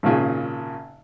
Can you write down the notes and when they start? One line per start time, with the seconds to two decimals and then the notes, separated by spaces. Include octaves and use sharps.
0.03 G#1 A#2 C#3 G#5